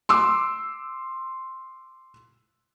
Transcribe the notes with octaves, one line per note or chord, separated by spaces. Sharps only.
C6 D6 E6